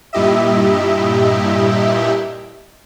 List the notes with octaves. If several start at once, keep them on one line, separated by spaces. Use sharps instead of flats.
G2 A#2 E4 G4 D#5 E5